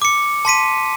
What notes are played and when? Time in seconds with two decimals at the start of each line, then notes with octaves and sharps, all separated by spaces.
0.02 D6 C#7
0.45 A5 C6 B6 D#7